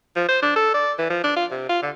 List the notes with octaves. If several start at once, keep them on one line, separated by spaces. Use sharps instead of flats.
F3
C5
D4
A4
D5
E3
F3
D4
F4
C3
F4
D3